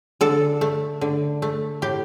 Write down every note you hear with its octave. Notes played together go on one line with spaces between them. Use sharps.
D3 A4
A3
D3
A3
A2 G4